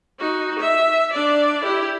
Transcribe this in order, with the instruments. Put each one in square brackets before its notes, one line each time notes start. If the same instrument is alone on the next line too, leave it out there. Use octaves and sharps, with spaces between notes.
[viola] D#4 F#4
E5
D4 D5
E4 G4